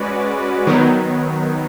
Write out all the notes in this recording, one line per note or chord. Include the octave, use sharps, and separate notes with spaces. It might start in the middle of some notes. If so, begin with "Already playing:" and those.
Already playing: G#3 C#4 F#4 B4 D5
D#3 F#3 B3